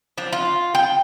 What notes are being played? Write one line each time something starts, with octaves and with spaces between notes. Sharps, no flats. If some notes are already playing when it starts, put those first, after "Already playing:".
F3 D4
F4
G5